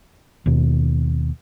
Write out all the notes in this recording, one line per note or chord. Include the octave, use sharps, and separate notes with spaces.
D#2 B2